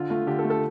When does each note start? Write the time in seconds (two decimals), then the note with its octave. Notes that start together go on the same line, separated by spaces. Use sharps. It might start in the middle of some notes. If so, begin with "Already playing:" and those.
Already playing: D3 F4
0.10 A3 F4
0.27 D3 G4
0.39 A4
0.44 A3
0.50 A4